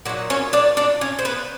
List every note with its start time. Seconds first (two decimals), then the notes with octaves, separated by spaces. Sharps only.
0.05 A#2 F#3 D#4 F#5
0.30 C#4 C#5
0.53 D4 D5
0.77 D4 D5
1.01 C#4 C#5
1.19 C5
1.25 B3 B4